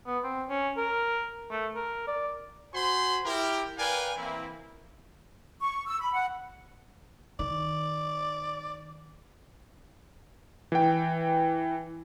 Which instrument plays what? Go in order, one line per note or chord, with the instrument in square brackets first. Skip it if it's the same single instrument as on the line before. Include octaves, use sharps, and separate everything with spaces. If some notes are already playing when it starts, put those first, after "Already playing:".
[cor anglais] B3
C4
C#4
A#4
A3
A#4
D5
[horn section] F#4 C5 G#5 B5 C6
E4 G4 A#4
A#4 B4 D5 F5 G5 G#5
E3 A#3 C4 E4
[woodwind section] C#6
E6
B5
F#5
[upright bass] D#3 [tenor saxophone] D5
[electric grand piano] E3 G5